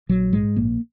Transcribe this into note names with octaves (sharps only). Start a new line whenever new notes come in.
A#1 F#3
G#2 G#3
A#1 A#3